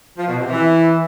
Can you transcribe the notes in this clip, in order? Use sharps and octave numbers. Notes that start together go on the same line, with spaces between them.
F3
B2
C3
E3